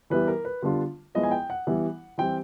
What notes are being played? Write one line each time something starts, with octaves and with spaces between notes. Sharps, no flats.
E3 G3 B3 E4 B4
A#4
B4
D3 G3 B3 D4 F4
F3 G#3 B3 E4 D#5
G#5
G5
F#5
E3 G3 B3 E4
E3 G3 C4 E4 G5